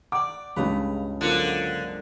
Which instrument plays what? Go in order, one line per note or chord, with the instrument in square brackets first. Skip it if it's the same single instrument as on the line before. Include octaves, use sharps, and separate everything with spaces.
[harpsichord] D5 G5 [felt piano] F#5 D6
[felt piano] C#2 G#3 [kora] G2 C#3 B4 [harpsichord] A#5
[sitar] D3 [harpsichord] F3 F#3 A#3